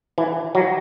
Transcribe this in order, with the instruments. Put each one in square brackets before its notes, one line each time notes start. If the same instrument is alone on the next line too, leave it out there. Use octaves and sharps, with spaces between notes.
[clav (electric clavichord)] E3
F#3